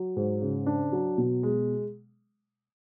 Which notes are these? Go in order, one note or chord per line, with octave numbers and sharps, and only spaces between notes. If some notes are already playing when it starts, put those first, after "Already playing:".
Already playing: F#3
G#2
C#3
D4
F#3
B2
G#3